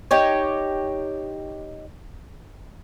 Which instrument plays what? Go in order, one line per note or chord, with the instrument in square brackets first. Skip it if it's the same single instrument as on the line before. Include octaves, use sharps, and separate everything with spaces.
[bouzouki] D#4 G4 C#5